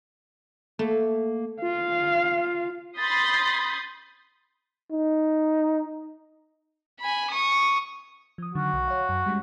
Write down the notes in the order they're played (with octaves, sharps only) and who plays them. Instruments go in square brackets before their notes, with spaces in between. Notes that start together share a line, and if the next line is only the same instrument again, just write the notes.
[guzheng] A3 [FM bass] A#3
[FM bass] F4 [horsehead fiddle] F5
[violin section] B5 C6 D#6 G6 A6 C7
[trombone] D#4
[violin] G#5 B5
C#6 D#6
[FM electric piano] F3 D#6
[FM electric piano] D3 D#3 F#3 [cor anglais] F#4
[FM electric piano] B1
C#5 F5
F#2
G3 G#3 C#4